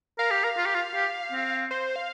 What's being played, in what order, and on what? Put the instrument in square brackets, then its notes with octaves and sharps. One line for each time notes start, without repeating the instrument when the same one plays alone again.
[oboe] A#4 [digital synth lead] F5
[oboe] G4
A#4
F4
G4
F4
G4
C4
[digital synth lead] C5
F5